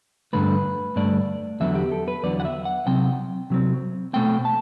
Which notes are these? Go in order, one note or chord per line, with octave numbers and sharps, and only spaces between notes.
G2 D3 A3 B4
G2 D3 A3 D5
E2 D3 F#3 B3 E5
G4
A4
B4
E2 D3 F#3 B3 D5
F#5
E5
F#5
C3 F#3 C4 G5
C3 F#3 C4
B2 A3 C4 G5
A5